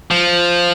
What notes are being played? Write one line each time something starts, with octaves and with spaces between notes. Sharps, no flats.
F3